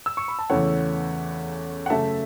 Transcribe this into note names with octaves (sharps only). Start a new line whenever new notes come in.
E6
C#6
B5
A5
E2 C#3 E3 A3 C#5 F#5
F#5
F#2 C#3 A3 E5 A5